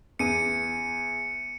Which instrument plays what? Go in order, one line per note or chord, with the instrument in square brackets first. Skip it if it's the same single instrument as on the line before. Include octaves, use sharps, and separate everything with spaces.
[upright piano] E2 [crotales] C#7 D#7